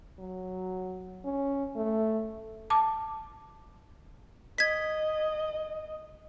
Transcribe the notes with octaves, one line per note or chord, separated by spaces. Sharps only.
F#3
C#4
A3
A5 D6
D#5 G#6 B6